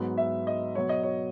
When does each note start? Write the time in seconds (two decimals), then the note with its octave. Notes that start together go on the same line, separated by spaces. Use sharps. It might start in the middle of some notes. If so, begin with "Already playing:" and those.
Already playing: G#2 F#3 B3
0.18 E5
0.47 D#5
0.75 B2 F#3 B3 C#5
0.89 D#5
1.03 C#5